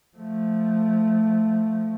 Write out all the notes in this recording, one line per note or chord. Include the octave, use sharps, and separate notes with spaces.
F3 A3